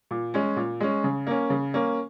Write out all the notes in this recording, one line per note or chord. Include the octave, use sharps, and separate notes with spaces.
A#2
G#3 C#4
A#2
G#3 C#4
C#3
A#3 C#4
C#3
A#3 C#4